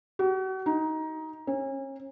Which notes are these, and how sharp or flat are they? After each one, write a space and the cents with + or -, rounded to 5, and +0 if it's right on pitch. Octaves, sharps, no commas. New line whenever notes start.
F#4 +40
D#4 +15
C#4 -35